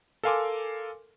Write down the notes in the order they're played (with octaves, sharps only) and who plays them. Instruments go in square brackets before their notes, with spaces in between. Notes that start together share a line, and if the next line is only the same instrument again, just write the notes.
[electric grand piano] A4 A#4 F5 G#5 C6 D6